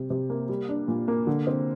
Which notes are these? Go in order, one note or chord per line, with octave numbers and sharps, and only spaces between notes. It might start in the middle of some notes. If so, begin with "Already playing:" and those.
Already playing: C3 G3
C3
A#3
G3
D4
A#2
A#3
D3
C4